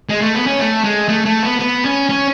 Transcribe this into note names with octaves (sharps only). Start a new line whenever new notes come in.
G#3
A3
B3
C#4
A3
G#3
A3
A3
B3
B3
C#4
C#4